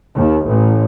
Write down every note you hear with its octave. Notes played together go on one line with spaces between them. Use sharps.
D#2
A1